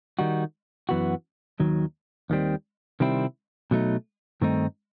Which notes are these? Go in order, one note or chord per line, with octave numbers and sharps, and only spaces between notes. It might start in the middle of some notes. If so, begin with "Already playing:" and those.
D#3 G3 D#4 F#4
F#2 E3 B3 F#4
D#2 D#3 F#3
D#2 D#3 G3 C4
C3 D#3 G3 C4 E4
B2 F#3 A3 D#4
G2 D#3 A3 C4 D#4